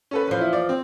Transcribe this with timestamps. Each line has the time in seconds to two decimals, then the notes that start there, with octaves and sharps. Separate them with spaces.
0.11 C#4 A4 B4
0.28 E2 F3
0.41 E4
0.53 D5
0.69 C4